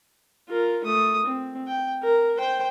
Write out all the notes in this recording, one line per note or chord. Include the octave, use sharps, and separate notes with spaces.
F4 A#4
A3 D#6
C4
G5
A#4
C5 G5